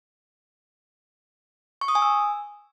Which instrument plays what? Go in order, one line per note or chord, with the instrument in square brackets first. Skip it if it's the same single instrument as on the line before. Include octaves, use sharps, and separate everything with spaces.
[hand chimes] C#6
D#6
G#5
E6